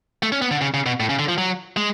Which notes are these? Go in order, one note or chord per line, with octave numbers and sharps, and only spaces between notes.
A3
C#4
B3
D3
C#3
C#3
B2
A2
C#3
D3
F3
F#3
G#3